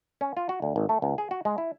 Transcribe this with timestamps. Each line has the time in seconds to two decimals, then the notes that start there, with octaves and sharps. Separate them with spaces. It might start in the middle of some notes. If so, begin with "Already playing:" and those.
0.21 C#4
0.37 F4
0.49 F#4
0.62 D2
0.76 G#1
0.89 A3
1.02 C#2
1.18 G#4
1.31 F#4
1.45 G#3
1.58 E4